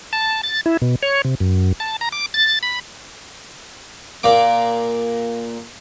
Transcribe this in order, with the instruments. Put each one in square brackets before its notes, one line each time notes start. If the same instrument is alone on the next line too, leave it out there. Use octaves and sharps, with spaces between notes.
[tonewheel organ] A5
A6
E4
B2
C#5
C3
F#2
A5
A#5
D6
A6
B5
[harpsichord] A#2 A#3 D6